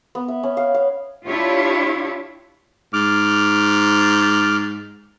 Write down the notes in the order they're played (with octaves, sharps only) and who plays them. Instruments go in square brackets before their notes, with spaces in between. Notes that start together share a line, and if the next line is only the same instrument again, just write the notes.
[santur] B3
E5
C#4
F5
F5
[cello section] D4 E4 F4 G4 C#5
[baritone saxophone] G#2 [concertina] D6 F6